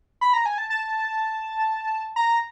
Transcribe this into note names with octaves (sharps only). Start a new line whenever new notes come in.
B5
A#5
G#5
A5
A5
A#5